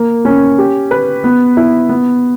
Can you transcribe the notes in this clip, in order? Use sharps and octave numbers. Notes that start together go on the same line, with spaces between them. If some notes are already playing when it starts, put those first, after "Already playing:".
Already playing: A#3
C#4
G4
B4
B3
E4
B3